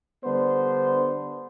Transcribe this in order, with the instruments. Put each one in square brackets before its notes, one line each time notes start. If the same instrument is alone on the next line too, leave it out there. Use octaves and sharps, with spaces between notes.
[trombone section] D3 G3 B3 D4 C5